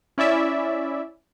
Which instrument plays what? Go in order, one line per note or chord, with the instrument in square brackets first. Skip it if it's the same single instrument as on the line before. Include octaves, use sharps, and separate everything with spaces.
[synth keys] C#4 E4 D5 E5